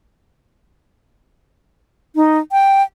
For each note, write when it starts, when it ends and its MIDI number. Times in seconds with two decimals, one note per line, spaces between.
2.15 2.38 63
2.52 2.83 79